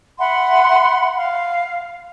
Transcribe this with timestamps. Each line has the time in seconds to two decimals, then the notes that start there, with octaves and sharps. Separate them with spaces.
0.19 E5 F#5 B5 C6
1.17 F5